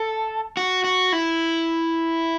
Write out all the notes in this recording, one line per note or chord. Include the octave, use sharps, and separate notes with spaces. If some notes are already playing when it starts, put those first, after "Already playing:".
Already playing: A4
F#4
F#4
E4